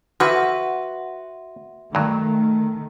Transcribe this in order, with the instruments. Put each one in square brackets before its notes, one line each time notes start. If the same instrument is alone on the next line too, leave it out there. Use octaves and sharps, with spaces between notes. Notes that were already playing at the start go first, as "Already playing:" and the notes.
[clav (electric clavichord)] E3 F3 [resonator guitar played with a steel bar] F#4 B4 [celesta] E5 F#5 C6
[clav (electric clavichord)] G2 F#3 [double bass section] D#3 A3